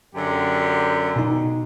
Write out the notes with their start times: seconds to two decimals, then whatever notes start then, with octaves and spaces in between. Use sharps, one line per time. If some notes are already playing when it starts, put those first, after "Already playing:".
0.15 F#2 D3 G4
1.16 B2 D#4